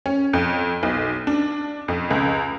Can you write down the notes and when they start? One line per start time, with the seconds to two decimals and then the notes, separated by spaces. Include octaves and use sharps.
0.06 C#4
0.33 F2
0.83 B1
1.27 D4
1.88 F2
2.10 C#2